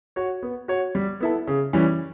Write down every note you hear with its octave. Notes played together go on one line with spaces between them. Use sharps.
F#4 C#5
B3
F#4 C#5
G3
B3 E4 A4
C#3
E3 G3 C#4